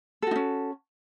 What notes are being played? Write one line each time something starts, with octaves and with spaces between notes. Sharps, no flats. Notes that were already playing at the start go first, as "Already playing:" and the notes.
C#4 D#4 F#4 A4